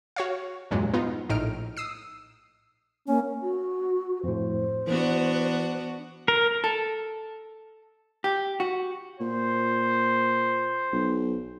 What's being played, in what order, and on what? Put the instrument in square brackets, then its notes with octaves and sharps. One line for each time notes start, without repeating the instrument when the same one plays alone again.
[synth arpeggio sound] F#4 C#5 F5
E2 G2 A#2 F#3 G#3
B3 D#4 F4
A#1 A2 D#4 F6 D7
D#6 E6 C7
[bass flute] A#3 [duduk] C#4
[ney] F#4
[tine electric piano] F2 A2 [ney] C5
[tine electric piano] E3 [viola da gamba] B3 D4 F#4
[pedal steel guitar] A#4
[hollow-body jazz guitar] A4
G4
F#4
[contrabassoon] A#2 [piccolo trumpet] C5
[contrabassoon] B1